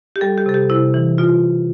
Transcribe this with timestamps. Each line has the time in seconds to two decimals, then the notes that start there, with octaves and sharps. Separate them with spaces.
0.16 G4
0.21 G3 A4
0.38 G4
0.46 C3 A4
0.54 G4
0.70 C3 E4
0.94 E3
1.18 B2 F4